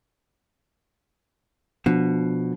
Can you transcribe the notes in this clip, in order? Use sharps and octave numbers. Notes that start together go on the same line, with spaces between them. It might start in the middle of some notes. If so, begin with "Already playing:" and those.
B2 F3 D4